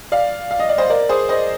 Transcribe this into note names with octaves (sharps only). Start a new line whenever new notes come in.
D5 F5
F5
D#5
D5
C5 D#5
A#4 D5
G#4 C5
C5 D#5